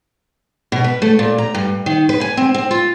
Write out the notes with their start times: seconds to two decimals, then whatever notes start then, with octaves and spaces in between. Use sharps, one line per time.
0.72 B2
0.84 B4
1.02 A3
1.19 A#2
1.38 A#5
1.54 G2
1.86 D#3
2.09 B4
2.21 G#5
2.37 C4
2.54 C4
2.71 F4